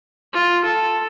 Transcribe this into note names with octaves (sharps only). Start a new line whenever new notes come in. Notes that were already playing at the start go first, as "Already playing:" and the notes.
F4
A4